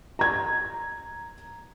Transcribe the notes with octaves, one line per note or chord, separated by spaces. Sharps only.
A#5 G#6